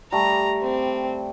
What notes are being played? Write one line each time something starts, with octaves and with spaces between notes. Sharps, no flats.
G3 A3 A#5
C4